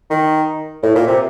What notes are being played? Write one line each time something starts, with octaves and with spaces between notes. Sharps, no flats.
D#3
A2
A#2
C3